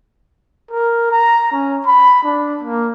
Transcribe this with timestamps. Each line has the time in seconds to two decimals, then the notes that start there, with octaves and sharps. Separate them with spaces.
0.71 A#4
1.11 A#5
1.52 C#4
1.86 B5
2.23 D4
2.63 A#3